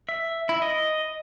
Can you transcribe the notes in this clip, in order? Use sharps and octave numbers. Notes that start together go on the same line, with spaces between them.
E5
E4
D#5